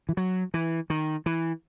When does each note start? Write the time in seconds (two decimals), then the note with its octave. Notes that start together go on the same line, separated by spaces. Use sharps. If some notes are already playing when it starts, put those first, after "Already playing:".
0.09 E3
0.17 F#3
0.54 E3
0.90 D#3
1.26 E3